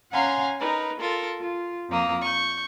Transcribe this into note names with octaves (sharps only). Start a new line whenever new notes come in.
C#4 F5 F#5 G#5 A#5 C6
D#4 A#4 B4
F4 A4 A#4
F4
F2 A#3 D#6
C#6 G6